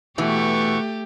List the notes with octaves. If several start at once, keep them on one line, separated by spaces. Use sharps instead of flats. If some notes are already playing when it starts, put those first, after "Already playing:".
B2 E3 A3 G4 C#6